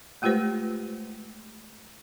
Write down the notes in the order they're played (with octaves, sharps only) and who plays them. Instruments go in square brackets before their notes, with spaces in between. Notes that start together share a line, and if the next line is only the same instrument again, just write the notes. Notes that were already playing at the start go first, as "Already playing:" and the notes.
[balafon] G#3 A3 F4 G4 B4 C5